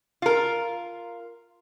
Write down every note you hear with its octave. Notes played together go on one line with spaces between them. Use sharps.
F4 A#4